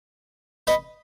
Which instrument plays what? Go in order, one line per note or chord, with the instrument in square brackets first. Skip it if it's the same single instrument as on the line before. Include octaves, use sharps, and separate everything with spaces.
[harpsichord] B4 D#5